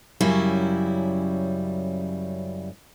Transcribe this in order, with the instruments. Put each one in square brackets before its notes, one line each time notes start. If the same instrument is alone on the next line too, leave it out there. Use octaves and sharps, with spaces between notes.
[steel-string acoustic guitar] F#2 C#3 F#3 G3 E4